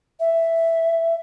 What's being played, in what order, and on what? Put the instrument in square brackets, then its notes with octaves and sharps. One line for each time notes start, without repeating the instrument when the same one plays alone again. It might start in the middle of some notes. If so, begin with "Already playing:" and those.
[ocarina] E5